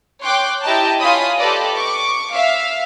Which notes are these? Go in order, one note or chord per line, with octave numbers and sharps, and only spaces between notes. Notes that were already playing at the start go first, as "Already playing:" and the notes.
C#5 G5 C6 D6 F#6
E4 G4 D#5 G5 A5 A#5
F4 C#5 G#5 B5 D#6
G4 A4 B4 D5 D#5
C#6 D6
E5 F5